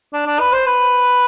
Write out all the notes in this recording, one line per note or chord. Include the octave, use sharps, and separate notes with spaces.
D4
D4
B4
C5
B4